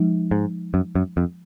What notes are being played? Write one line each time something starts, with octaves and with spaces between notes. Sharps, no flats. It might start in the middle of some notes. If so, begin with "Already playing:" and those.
Already playing: F3 G#3 D#4
G#2
F#2
F#2
F2